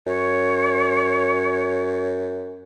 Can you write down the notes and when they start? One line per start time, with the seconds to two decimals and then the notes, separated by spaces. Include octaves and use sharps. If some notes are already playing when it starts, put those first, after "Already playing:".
0.07 F#2 C#5